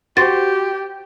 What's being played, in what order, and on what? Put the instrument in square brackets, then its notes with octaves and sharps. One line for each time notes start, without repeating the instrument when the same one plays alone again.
[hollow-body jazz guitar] F#4 C5 [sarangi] G4 [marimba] A6